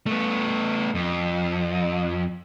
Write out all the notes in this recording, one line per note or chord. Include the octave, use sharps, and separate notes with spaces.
A3 B3
F2